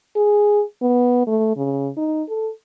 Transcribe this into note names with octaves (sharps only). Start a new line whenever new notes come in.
G#4
B3
A3
C#3
D#4
A4